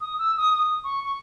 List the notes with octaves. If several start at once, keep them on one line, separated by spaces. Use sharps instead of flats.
D#6
E6
D#6
D#6
C#6
C#6